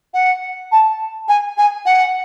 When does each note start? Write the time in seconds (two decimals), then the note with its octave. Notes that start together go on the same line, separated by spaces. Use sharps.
0.13 F#5
0.71 A5
1.28 G#5
1.57 G#5
1.85 F#5